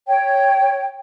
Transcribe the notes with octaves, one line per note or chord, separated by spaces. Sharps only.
C#5 G5